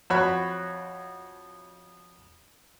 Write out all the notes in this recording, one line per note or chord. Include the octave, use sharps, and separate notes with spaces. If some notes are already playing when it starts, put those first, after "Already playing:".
F2 F#4 C#5 B5 F#6